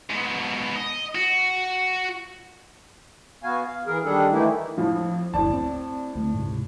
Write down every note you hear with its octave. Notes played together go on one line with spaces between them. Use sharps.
G#2 B2
D#5
F#4
B3 F#4 F5 G#5
F5
E3 G#4 A#4
D#3 G3 D4 G#4 A4
D#3 E3 A3 A#3 D#4 E4
F2 A2 F3
F#1 D2 A2 D5 A5
C4
D2 A3
G#2 C3